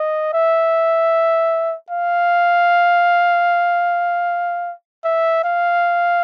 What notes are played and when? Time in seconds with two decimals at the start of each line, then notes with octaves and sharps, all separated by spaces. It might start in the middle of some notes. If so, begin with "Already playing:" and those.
Already playing: D#5
0.34 E5
1.90 F5
5.04 E5
5.44 F5